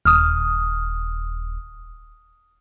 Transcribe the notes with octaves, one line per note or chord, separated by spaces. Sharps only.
D#1 D#6 F6